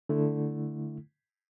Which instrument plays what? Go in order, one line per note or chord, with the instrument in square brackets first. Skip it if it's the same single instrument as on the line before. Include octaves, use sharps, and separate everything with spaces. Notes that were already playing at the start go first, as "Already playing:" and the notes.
[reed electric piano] D3 A3 E4